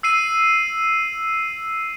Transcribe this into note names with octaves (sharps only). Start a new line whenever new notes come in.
E6 C7 D#7